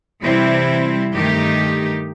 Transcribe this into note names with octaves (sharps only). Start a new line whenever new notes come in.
C3 E3 G3 C4 E4
G2 D#3 A3 D#4 G4